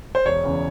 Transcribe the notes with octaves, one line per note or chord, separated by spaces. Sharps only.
C5
E1 C#5
E2 C#3